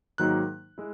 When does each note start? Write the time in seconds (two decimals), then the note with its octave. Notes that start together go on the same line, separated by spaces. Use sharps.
0.18 G#2 D#3 F#3 A#3 D#4 F#6
0.78 G#3 E4